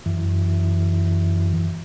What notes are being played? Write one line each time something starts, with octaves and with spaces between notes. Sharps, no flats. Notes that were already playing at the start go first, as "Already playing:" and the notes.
F#2 E3